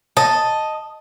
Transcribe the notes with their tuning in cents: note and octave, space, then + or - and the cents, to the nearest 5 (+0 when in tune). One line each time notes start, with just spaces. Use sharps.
D#5 +0 A5 +0